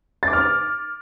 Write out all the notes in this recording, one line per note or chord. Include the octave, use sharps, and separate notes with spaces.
A6
D6
F6